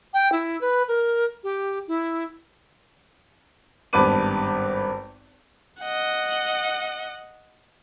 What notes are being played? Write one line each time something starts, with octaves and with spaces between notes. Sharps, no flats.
G5
E4
B4
A#4
G4
E4
G#1 G2 B3 B4 D6 D#7
D#5 F#5